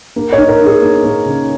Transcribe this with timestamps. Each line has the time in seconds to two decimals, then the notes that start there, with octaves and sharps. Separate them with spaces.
0.16 A#3
0.32 C#5
0.38 D#4
0.48 A#4
0.60 D#4
0.66 G#4
0.82 A#3
1.04 A#3
1.26 C#3